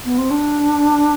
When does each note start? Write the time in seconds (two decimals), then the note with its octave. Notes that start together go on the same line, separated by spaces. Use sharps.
0.05 B3
0.18 C4
0.31 D4